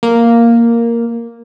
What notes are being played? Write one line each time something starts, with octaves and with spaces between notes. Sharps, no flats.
A#3